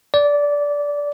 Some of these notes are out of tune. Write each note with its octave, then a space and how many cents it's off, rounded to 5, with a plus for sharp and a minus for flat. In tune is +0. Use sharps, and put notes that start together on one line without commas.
D5 -15